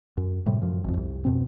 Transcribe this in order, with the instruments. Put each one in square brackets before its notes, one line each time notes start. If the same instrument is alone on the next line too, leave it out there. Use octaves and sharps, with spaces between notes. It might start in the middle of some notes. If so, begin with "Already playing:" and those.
[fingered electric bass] F#2
A2 C3 G3
F#2 F3
G#1 F2
C2
F2 B2 C4